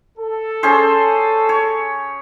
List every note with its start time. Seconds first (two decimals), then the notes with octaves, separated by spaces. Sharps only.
0.18 A4
0.63 C#4 G#4 C5
1.49 C#5